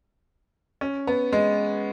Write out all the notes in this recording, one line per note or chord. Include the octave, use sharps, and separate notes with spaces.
C#4
B3
G#3